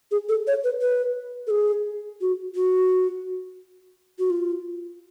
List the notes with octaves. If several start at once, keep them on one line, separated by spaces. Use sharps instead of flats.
G#4
A4
C#5
B4
B4
A4
G#4
F#4
F#4
F#4
F4